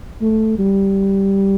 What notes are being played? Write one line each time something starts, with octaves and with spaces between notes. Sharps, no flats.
A3
G3